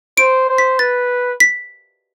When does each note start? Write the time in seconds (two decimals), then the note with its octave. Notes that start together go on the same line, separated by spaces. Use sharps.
0.17 C5 D7
0.48 C5
0.58 B6
0.79 B4 A6
1.40 B6